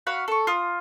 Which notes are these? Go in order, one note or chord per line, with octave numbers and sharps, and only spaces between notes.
F#4 F5 F#5 B5
A4 C#6
F4 D#6